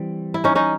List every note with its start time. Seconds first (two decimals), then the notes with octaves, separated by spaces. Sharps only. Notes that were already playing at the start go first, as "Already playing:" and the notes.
Already playing: E3 G3 C4
0.34 E4
0.44 C#4 D#4
0.55 C#4 D#4